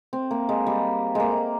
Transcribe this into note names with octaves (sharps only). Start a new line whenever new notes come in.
C4
A#3
G#3
G3
G#3 A#3